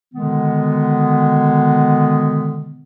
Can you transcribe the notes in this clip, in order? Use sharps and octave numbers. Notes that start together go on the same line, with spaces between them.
B2 D3 D#3 G#3 B3